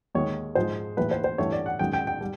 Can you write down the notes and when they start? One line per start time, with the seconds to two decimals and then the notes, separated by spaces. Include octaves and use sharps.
0.15 D#2 D#3 G#3 C#5
0.55 G#2 F3 G#3 C5
0.97 A#1 A2 E3 B4
1.11 C5
1.24 C5
1.38 G2 E3 A3 C#5
1.52 D5
1.66 F#5
1.79 F#2 D#3 G#3 G5
1.93 G5
2.07 G5
2.21 G3